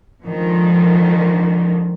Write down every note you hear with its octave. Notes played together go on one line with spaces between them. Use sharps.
D3 D#3 F3 G#3